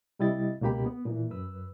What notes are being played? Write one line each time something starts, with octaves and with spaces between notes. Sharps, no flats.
C3 G3 E4 D#5 A6
C#2 B2 A#3 G4 B5
B3
A#2 E3
F#2 B4 E6